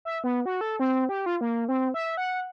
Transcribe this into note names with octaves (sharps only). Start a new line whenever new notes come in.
E5
B3
F#4
A4
C4
G4
F4
A#3
C4
E5
F#5